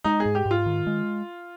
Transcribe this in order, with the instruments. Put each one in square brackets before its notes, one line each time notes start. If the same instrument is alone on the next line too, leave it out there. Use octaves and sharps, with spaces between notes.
[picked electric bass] G#3 [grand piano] D#4
[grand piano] G#4
[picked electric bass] G#2
[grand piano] G4
[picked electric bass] G#2
[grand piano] F4
[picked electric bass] D#3
G#3